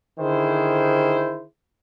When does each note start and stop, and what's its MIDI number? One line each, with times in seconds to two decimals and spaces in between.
0.20 1.45 50
0.20 1.45 51
0.20 1.45 64
0.20 1.45 68
0.20 1.45 72